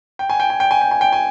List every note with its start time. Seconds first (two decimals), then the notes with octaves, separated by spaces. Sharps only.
0.19 G5
0.29 G#5
0.40 G5
0.50 G#5
0.60 G5
0.71 G#5
0.81 G5
0.91 G#5
1.01 G5
1.12 G#5